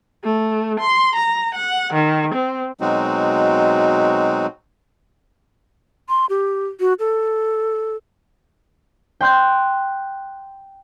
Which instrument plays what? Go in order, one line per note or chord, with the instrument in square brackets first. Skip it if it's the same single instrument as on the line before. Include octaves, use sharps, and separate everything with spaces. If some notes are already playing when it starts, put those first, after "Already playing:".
[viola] A3
C6
A#5
F#5
D#3
C4
[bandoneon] B2 F#3 G#3 C4 D#4 F#4
[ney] C6
G4
F#4
A4
[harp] G5 C6 F#6 G6